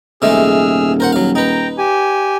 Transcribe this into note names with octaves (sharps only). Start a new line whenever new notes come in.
D#1 C3 G#3 A3 G#4 E6 F6
A#4 C5 F#5
F#3 F5
D#4 B4 G5 A#5
G4 G#5